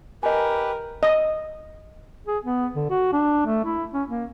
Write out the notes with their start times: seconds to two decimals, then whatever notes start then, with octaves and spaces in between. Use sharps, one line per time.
0.23 G4 A#4 B4 D#5 G#5
1.03 D#5
2.27 G#4
2.44 B3
2.75 D3
2.90 F#4
3.12 D4
3.46 A3
3.64 E4
3.93 C#4
4.09 A#3